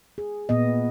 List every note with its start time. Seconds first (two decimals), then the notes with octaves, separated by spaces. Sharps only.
0.18 G#4
0.49 A#2 B3 D#5